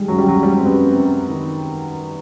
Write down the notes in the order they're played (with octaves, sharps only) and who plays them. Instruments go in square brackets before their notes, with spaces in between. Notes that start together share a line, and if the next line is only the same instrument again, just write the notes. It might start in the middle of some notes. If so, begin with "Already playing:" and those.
Already playing: [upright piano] D#3 G#3 [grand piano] G3
[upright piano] F#2 [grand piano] F#3
[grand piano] G3
[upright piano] F#2 [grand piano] F#3
[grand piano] G3 [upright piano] G#3
[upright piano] F#2 [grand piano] C4
[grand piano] B3
[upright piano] F#2
[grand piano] C4
[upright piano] F#2
F#2
D#3